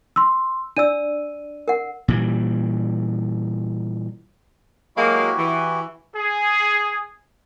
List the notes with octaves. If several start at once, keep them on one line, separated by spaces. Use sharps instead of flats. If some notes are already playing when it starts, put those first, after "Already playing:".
C6 E6
D4 D5 E6 D#7
A#4 F#5
A#2 E3 G3
F#3 G#3 A#3 E4 F#4 G4
E3
G#4